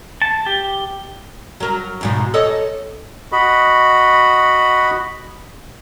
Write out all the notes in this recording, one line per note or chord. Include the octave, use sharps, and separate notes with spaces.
A5
G4
F#3 A#4
E2 G#2 B2
A4 C#5 D#5
F#4 D#5 B5